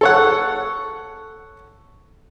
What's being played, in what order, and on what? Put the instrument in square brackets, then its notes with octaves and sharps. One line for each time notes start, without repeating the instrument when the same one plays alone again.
[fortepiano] A4 C#5 F#5